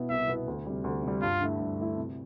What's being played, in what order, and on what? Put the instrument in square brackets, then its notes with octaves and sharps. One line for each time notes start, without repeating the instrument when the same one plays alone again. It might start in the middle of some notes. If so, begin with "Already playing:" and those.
Already playing: [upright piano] B2 B3 E4
[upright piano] C2 [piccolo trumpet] E5
[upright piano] B2 B3 E4
D2
C3 G3
D2
C3 G3
[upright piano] G2 [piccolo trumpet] F4
[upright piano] D3 A3 E4
G2
D3 A3 E4
C3